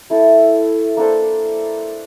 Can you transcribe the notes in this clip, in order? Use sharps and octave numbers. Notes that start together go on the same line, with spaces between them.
A3 E4 A4
A#3 D4 A4 C5